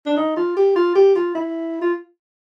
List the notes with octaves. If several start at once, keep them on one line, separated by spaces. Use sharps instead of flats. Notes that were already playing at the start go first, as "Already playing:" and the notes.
D4
D#4
F4
G4
F4
G4
F4
E4
F4